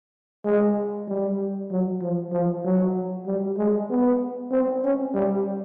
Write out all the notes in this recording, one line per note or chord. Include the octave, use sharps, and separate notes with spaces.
G#3
G3
F#3
F3
F3
F#3
G3
G#3
B3
C4
C#4
G3